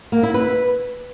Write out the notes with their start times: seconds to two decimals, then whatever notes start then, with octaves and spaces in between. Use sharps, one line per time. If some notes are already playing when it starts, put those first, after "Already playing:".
0.12 A#3
0.23 E4
0.34 B4